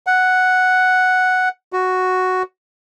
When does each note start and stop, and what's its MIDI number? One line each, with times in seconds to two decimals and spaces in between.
0.07 1.49 78
1.73 2.43 66